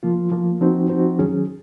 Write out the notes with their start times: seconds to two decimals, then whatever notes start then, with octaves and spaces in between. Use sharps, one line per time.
0.03 F3 A#3 F4
0.32 F3 A#3 F4
0.61 F3 C4 D#4 F#4 C5
0.90 F3 C4 D#4 F#4 C5
1.19 D#3 F#3 C#4 G#4